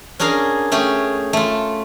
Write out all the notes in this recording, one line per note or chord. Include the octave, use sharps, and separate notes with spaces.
C#4 D4 G#4 A#4 F5
A3 C#4 G4 G#4
A3 F4